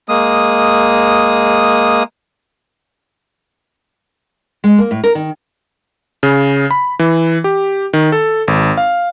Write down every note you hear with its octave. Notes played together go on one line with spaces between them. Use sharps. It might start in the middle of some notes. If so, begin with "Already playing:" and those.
G#3 A#3 D#6
G#3
A#3
A2
A#4
D#3
C#3
B5
E3
G4
D#3
A4
G#1
F5